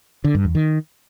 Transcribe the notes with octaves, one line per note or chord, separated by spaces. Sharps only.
D3
G2
E2
D#3